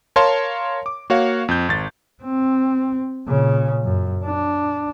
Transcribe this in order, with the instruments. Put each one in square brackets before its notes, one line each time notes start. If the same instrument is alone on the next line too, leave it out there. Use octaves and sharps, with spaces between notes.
[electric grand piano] A#4 C#5 F5 A5 C6
D6
A#3 F#4 C#5 F5
F2 G6
G#1 A6
[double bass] C4
A#2 C#3
F#2
D4